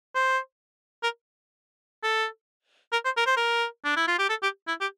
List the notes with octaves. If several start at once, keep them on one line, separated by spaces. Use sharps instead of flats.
C5
A#4
A4
A#4
C5
A#4
C5
A#4
D4
E4
F4
G4
A4
G4
E4
G4